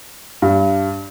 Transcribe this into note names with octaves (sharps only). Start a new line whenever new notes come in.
G2